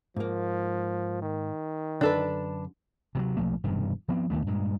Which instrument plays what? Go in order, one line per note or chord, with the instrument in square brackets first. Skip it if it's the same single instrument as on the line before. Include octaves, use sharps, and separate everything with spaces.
[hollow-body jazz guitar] G#2 A#3 [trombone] F3
[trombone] D#3
[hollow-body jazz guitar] F#2 D3 [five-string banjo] D4 A4 B4
[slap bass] C3 F3 F#3
B1 F3 A3 A#3
E1 G2 C3 D#3
F3 B3 C4
D#2 D#3 A3 B3
G2 A#2 G#3